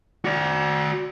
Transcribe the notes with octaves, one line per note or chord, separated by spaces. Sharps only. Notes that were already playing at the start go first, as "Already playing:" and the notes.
F#4 D5